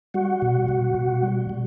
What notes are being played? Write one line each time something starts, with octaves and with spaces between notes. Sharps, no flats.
G3 F#4 F#5
B2
B2
B2
G3
G3